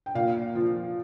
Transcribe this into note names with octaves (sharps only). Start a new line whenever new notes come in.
G5
A#2 F5
F3